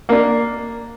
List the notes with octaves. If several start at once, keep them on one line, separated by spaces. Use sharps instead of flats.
A#3 D4